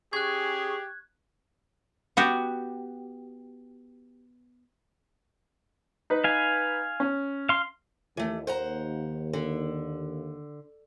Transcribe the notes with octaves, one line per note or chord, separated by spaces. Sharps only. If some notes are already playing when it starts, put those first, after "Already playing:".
C#4 G4 G#4 C#6 F#6 G#6
B3 F#4 G4
D#4 B4
F5 G#5
C#4
F5 C6
D#2 E3 A3
C5 F#5 A#5
D3